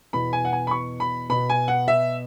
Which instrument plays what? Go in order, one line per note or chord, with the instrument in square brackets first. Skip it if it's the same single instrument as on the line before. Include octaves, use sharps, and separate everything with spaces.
[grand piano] E2 B2 B3 B5
G#5
F#5
G#5
B5
C#6
B5
B2 B3 B5
G#5
F#5
E5